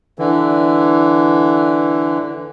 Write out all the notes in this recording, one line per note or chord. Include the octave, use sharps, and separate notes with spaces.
D3 E3